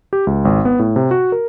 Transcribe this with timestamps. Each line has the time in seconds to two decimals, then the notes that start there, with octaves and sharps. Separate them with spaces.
0.13 G4
0.27 C#2
0.45 G#1
0.65 B3
0.79 A2
0.96 C3
1.11 F#4
1.32 A#4